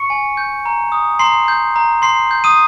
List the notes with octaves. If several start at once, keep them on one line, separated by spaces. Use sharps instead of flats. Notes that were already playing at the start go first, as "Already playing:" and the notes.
Already playing: C#6 C#7
G#5
G6
A#5
D#6
A#5 C6 C7
G6
A#5
C6 C7
G6
D#6 D#7